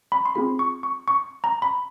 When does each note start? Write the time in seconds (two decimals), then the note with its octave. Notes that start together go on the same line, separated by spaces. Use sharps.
0.12 B5
0.26 C6
0.35 C4 F4 G#4 B5
0.59 C#6
0.83 C#6
1.08 C#6
1.44 A#5
1.62 B5